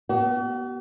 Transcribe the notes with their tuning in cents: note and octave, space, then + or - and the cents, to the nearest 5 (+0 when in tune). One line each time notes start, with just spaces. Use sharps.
B3 -20 F#4 +45